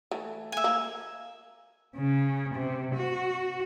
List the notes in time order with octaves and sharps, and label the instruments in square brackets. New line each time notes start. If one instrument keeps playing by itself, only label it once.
[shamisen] E3 A3
[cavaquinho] E5 G#5
[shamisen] A#3
[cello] C#3
C3
F#4